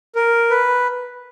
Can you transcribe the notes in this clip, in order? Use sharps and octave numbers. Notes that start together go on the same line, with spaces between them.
A#4
B4